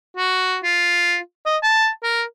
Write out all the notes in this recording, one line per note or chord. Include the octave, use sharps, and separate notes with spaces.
F#4
F4
D#5
A5
A#4